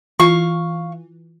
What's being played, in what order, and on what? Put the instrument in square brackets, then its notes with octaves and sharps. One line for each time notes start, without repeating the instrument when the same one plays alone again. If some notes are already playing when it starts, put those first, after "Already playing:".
[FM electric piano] E3 [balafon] F4 [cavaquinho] F5 C#6